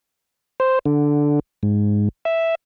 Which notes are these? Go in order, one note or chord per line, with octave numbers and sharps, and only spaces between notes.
C5
D3
G#2
E5